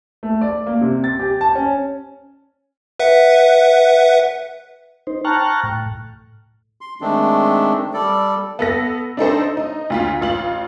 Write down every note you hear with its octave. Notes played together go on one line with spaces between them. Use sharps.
A3
D5
A#3
C3
A6
G4
A5
C#4
B4 E5 F#5
D#4 C5
G5 A5 A#5 C#6 F6 F#6
A2
C6
D#3 G#3 A3 C4 D4
G3 A4 D5
B3 A4 A#6
D4 D#4 A4 C5
D#4
D2 F4 B6
A1 F4 F#7